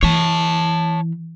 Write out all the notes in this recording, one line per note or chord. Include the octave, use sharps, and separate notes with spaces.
E3 C#5 A5